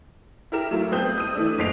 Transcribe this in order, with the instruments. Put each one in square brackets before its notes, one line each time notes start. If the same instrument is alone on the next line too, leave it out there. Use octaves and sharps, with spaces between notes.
[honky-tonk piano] E4 G4 A#4 E7
F#3 A3 E4 F4
G3 B3 C4 D#6 F#6 G6
D#6 E6 D#7
E3 A3 D4
F#1 A#2 C5 C7 D7 F7